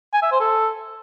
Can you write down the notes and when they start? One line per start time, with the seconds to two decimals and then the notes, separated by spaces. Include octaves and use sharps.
0.13 G#5
0.22 E5
0.31 C5
0.40 A4